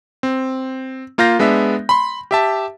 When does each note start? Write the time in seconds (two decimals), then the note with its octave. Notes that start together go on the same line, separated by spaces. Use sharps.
0.23 C4
1.18 A#3 F4 F5 G6 A#6
1.39 G#3 B3 D4 E5
1.89 B5 C6
2.31 G4 E5 A5